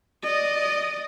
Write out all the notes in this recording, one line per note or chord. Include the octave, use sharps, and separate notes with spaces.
D5 D#5